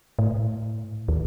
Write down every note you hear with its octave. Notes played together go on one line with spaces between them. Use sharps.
A2
D#2